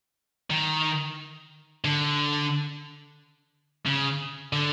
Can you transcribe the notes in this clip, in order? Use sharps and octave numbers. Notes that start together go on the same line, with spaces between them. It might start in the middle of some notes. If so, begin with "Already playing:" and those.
D#3
D3
C#3
D3